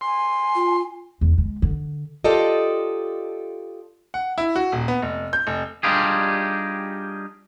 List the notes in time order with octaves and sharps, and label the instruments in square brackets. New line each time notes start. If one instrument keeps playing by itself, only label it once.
[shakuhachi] G#5 [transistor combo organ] C6
[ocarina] F4
[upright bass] E2
G#3
D3
[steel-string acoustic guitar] F4 G4 A4 D5 D#5
[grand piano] F#5
E4
F#4
D#1
B3
F1
G6
F1
[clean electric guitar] G3 D4 D#4 F4 G4 G#4